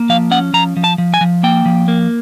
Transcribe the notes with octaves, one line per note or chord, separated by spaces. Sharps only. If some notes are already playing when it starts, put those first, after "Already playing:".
Already playing: A#3
F3 F5
C#4 F#5
F3 A#5
F3
A5
F3
G#5
F3
A#3 G5
F3
A#3